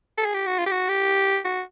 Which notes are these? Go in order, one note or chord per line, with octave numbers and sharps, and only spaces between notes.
A4
G#4
G4
F#4
F4
G4
F#4
G4
F#4